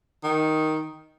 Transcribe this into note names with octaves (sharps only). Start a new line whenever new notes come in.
D#3